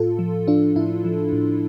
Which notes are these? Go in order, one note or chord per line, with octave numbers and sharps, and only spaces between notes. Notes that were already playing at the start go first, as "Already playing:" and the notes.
Already playing: A2 F4 A4
F3
F3 D4 F4
A2 E4
F3
A2